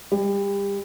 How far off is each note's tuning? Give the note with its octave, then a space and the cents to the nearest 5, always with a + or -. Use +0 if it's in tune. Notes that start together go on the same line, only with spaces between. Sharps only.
G3 +30